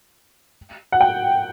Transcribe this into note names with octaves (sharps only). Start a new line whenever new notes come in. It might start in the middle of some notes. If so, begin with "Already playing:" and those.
F#5
G5